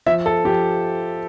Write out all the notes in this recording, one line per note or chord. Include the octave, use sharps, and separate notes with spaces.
F3 E5
A4
F3 G4